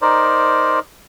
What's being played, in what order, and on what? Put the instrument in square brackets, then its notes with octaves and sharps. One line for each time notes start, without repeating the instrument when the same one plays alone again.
[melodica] D#4 A#4 C5 D5